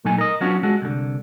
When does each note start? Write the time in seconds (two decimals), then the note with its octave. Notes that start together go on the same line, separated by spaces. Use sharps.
0.05 A#2 F#3 A3 D#4 G#5
0.18 A#4 D#5
0.41 F#3 B3 C#4 D4 F4 F#4
0.63 G#3 F#4 A4
0.82 C2 D3